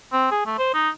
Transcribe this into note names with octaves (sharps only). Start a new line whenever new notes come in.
C4
G#4
A3
C5
D#4